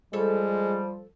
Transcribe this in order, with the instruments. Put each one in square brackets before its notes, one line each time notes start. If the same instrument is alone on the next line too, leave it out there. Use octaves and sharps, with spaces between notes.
[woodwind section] F3 G3 [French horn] G#3 [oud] A4 C#5